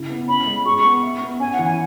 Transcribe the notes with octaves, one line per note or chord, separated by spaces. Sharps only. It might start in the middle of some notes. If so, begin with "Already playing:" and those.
Already playing: C#3 E4
B3
C#4 B5
G#3
G#4 C#6
C#6
B3
E5
B3
C#4 G#5
F#5
E3
G#5